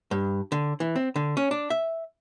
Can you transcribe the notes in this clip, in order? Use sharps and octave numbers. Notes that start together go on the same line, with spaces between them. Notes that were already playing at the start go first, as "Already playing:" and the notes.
G2
D3
E3
C4
D3
C#4
D4
E5